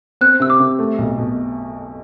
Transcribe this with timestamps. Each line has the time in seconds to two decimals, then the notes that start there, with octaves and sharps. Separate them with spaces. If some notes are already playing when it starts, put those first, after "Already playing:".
0.21 C4 F#6
0.40 C3 E6
0.50 D6
0.60 C3
0.79 A3
0.98 B1
1.18 B2